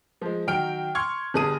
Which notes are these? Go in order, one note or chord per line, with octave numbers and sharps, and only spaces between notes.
F3 G#3
D#3 F#3 G5 F6 D7
C6 C#6 F6 G#6
G1 G4 G#4 A5 D#6 D#7